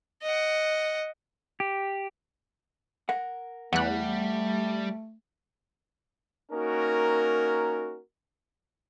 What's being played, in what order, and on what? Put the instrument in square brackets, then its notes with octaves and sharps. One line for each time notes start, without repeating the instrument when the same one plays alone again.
[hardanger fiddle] D#5 F#5
[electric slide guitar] G4
[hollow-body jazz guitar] A#4 F#5
[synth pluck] E2 F#6 [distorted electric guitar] G3 [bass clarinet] A3 [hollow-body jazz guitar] F#5
[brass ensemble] A#3 C#4 D#4 F#4 A#4